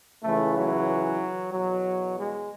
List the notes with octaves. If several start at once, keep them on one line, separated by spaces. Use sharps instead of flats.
C#2 C#3 E3 A3
F#3
E2 B2 F#3
G#3